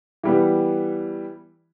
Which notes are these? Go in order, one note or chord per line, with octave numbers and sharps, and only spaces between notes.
E3 G3 B3